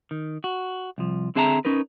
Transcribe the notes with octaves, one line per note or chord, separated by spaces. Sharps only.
D#3
F#4
C2 F3
D3 C4 G#4 E5 A5 A#5
C#4 D#4 A#4 B4